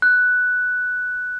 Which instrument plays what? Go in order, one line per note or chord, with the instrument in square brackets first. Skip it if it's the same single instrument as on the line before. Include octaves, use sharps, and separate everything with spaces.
[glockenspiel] F#6